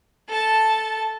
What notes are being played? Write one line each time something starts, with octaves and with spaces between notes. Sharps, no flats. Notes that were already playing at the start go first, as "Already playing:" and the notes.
A4 A5